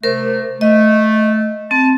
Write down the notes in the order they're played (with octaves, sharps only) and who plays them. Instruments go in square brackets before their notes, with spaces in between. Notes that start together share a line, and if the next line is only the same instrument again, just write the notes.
[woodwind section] C3 A3 [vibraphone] A#4 C5
[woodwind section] A3 [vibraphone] D#5
[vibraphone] C4 [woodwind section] A5